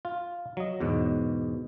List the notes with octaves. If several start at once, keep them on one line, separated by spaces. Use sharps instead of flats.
F4
F#3 D#5
E2 G#2 B2